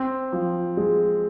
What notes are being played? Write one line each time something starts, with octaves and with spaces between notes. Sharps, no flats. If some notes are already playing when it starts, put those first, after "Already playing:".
Already playing: C4
F3
G#3